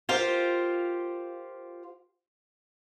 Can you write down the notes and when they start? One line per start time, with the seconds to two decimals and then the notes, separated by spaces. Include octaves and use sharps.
0.09 F4 G4 A#4 C5 F5